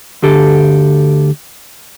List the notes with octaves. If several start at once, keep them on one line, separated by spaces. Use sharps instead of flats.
D2 D3 G4 A4